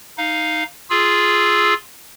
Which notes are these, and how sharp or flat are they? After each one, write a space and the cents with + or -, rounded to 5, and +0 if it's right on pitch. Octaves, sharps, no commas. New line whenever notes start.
D#4 +0 F5 +0
F4 +0 G#4 +0 E6 +0